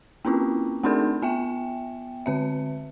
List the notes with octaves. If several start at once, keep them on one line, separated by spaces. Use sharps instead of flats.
A#3 C4 C#4 E4 F4
A3 C4 D4 D#4 G#4 A#4
B3 E5 G5
D3 C4 E5